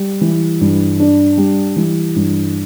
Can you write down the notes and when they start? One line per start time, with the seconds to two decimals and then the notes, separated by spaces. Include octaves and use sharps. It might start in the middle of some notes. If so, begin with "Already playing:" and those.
Already playing: G3
0.21 E3
0.61 G2
1.00 D4
1.37 G3
1.76 E3
2.16 G2